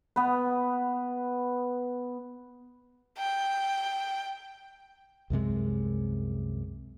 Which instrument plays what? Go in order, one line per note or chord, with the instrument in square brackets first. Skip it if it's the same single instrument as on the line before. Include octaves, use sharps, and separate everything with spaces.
[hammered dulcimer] B3 B4
[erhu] G5
[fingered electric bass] C2 F#2 C3 G#3